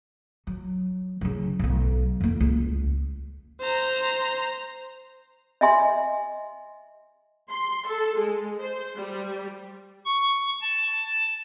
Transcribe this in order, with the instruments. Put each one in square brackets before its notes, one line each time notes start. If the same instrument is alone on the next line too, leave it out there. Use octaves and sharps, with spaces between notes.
[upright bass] F#3
C#3 F#3
E1 B1
F2 A#3
C#2
[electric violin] C5 A#5
[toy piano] D#5 E5 G#5 C6
[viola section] C6
A4
G#3
C5
G3
[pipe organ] C#6
A5